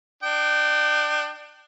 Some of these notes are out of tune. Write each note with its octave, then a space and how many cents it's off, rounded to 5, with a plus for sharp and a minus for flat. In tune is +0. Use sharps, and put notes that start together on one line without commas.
D4 +25 G5 -20 D6 +45